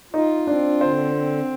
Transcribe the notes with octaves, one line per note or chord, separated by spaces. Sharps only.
D#4 F4
C4 D4
D3 C5
C4